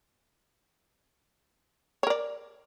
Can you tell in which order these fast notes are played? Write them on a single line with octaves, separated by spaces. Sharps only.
C#5 A#4 D5